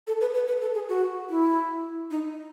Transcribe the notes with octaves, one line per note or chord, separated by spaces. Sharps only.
A4
B4
B4
B4
A4
G#4
F#4
E4
D#4